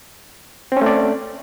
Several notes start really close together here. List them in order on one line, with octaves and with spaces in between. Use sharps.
C4 C#4 A3 D5